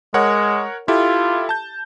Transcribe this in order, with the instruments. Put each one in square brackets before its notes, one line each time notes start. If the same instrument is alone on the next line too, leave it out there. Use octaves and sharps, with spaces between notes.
[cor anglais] G#3 [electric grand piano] A#4 C#5 F#5
[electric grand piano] E4 G4 A4 [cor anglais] F4
[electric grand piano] A5 G6